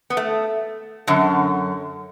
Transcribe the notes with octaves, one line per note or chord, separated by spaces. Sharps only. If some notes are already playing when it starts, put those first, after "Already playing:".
B3
A3
F#2 D3